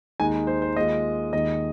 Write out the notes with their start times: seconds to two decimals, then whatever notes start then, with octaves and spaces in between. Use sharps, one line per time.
0.20 D#2 D#3 G#3 D#4 G#5
0.47 C5
0.62 C5
0.76 D#2 D#3 G#3 F4 D#5
1.33 D#2 D#3 G#3 D#5